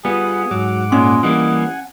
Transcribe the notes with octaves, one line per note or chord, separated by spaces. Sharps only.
G3 B3 F4 G#4 F#5
G#2 F#3 F#5 D6
A#2 G#3 C#4
E3 G3 A#3 D#5 F#5 G#5